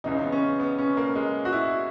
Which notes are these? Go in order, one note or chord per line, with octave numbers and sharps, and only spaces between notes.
C#2 C#3 E3 D#4
B3
C#4
B3
C#4
A#3
G#3
F#4
E4